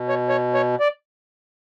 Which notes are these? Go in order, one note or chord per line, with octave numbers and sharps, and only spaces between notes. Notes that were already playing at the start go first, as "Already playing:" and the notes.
Already playing: B2
C#5
C#5
C#5
D5